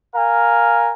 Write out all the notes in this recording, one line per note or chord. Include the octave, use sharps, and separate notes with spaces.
A#4 F5 G#5